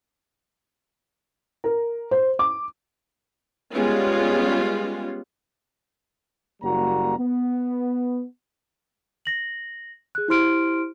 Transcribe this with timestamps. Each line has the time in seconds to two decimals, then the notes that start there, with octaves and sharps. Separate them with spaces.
1.64 A#4
2.11 C5
2.39 D6
3.73 G3 G#3 B3 C#4 F4
6.62 F#1 G3 A#3 F#4 A#5
7.17 B3
9.25 A#6 F#7
10.15 G#4 F#6
10.28 E4 G4 C5 C6 F6 D7